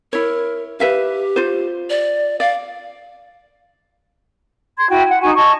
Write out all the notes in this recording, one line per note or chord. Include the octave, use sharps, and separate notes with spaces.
E4 A#4 C#5
G4 B4 E5 F5
F4 C5
D5
D5 F5
C6 G#6
E4 F#4 G5
F#5
D#4 F#4 G#5 C#6
D#5 A5 C#6 G#6